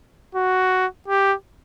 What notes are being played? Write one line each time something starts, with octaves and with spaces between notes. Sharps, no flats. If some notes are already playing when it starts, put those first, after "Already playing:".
F#4
G4